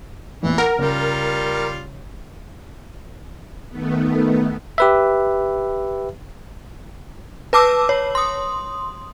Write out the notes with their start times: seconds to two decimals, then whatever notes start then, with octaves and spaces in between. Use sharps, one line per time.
0.43 A1 E2 A#2 E3
0.58 A#4 F#5
0.79 C#3 G3 F4
3.70 D#3 A3 B3
4.78 G4 B4 E5
7.53 B4 A5 D6 E6
7.89 C#5
8.15 C6 D#6